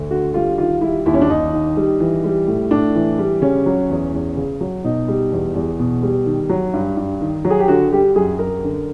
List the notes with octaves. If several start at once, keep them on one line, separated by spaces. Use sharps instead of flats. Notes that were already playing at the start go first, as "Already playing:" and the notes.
Already playing: D2
D3 F#4
G3 F4
D#3 F4
G3 E4
D#2 E4
C#4
D4
D#2 D#4
D#3
G3
E3
G3
A2
A2 D4
E3
G3
C#3 C#4
F#3
E2
E2
C#3
F#3
B2 D#4
G3
E2
E2
B2
G3
D#3
F#3
G2
G2
D#3
F#3
G#4
G4
D3 F#4
G3 G4
F#2 G#4
F#2 A#4
D3